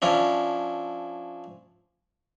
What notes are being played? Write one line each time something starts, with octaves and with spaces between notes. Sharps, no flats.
F3 C#4 D4 E4